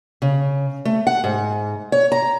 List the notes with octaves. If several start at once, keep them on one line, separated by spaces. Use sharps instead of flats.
C#3
A3
F#5
G#2
C#5
A#5